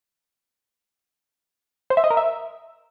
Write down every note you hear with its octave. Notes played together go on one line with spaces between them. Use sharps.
C5
E5
D#5
A#4
E5